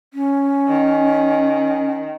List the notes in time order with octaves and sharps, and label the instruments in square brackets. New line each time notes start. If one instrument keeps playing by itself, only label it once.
[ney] C#4
[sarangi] D#3